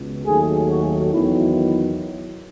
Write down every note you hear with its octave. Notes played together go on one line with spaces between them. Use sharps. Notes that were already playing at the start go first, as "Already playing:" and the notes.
Already playing: C#2 B2
D#2 D#3 F#3 A3 G#4
F#4
E2 D#3 F#3 B3 E4